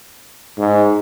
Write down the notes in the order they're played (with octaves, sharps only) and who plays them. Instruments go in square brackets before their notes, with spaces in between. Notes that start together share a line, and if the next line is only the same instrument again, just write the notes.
[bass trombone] G#2